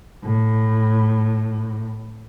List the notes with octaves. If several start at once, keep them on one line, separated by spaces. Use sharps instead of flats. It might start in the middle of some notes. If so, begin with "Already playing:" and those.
A2